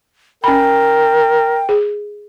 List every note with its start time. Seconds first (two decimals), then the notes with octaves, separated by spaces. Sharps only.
0.44 C#4 A#4 G5 B5
1.69 G#4